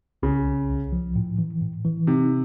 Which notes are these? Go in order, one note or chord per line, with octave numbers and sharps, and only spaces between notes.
C2 C#3
C2
C2
F3
A2
E3
A2
E3
C3 D#4